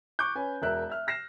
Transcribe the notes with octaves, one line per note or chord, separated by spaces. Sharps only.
C#6 D6 F#6 G6
C#4 B4 G#5
E1 A#4 E5 F#6
E5 F6
F6 A#6 C7 E7